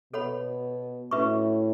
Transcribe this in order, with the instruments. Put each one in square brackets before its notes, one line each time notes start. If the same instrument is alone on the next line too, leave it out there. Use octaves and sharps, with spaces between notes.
[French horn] B2 [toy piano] A4 C#5 F#5 B5
[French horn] A2 [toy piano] C#4 F#4 B4 E5 C#6